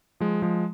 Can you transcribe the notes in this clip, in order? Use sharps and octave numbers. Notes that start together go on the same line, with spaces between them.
F3 G#3
F3 G#3